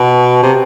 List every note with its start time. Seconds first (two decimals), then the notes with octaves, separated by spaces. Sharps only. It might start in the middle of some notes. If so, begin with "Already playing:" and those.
Already playing: B2
0.43 C3